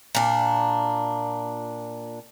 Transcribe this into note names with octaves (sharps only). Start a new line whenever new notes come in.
A#2 D4